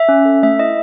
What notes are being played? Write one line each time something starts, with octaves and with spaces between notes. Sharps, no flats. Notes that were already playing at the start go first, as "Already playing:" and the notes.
Already playing: E5
C#4
A4
A3 E5
E4 D#5